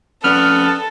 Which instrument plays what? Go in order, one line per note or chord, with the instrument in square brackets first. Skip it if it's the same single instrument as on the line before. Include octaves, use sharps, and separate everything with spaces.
[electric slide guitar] F2 C#4 D5 [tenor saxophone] B3 [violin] A4 [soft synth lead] F6